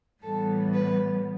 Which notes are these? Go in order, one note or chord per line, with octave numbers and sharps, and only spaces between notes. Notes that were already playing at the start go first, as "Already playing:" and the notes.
A2 E3 G3 B3 A4
B4